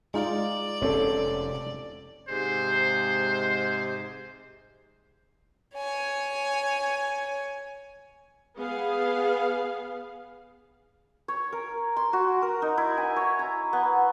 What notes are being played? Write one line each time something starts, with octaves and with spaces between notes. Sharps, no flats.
G#3 D#4 F4 D5
F1 C4 C#4 A4 C#5
G#2 C3 G#3 C5
C#5 G#5
B3 G#4 F5
C#5
A#4
C6
F#4
A#4
D#4
E4
G#5
C#5
A#5
B3